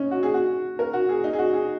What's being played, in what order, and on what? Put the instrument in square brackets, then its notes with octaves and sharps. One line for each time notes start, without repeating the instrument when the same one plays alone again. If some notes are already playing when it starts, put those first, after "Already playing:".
Already playing: [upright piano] C#4 D#4
F#4
G#4
F#4
A#4
F#4
G#4
D#4
G#4
F#4
G#4